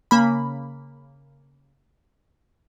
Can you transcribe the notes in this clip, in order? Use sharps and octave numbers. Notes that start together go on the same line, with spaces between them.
C#3 A#3 B5